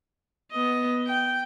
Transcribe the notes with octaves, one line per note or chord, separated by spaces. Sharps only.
B3 D#5
G5